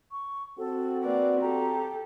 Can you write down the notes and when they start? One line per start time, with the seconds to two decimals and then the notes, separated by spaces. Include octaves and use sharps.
0.12 C#6
0.58 C4 F#4 A4
1.03 A#3 B4 D5
1.41 G4 A4 A#5